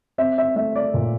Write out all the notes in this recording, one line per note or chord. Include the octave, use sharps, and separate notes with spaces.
C4 E5
E5
A3 E5
D5
A#2